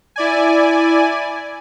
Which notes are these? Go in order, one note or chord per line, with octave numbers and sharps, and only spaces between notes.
E4 D5 G#5